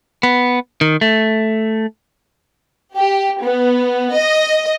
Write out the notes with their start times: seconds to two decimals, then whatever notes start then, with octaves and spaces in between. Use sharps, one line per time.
0.23 B3
0.81 D#3
1.01 A3
2.95 G4
3.42 B3
4.15 D#5